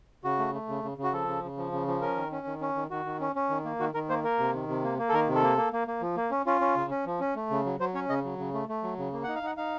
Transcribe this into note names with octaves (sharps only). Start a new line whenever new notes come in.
C#3 F#4
A3
A3
C#3
C#3
C#3
F#4
F3 A4
C#3
C#3
F3
C#3
F3
C#4 A#4
D#3
C#4
D#3
C#4
D#3
D#3 F#4
D#3
C#4
C#4
D#3
A#3
D#3 F#4
D#3 A#4
A#3 C5
A#3 A#4
C3
D#3
C3
A#3
A#3
A4
D#3 A#4
C3
A4
A#3
A#3
A#3
A#3
F3
A#3
C#4
C#4 F4
C#4
C#3
C#4
F3
C#4
A3
C#3
F#3
F#3 C5
C#4 C#5
C#3 D#5
F#3
C#3
A3
A3
F#3
C#3
A#3
D#4 F#5
F5
D#4 F#5
D#4 F5